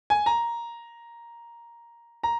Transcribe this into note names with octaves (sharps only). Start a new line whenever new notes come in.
G#5
A#5
A#5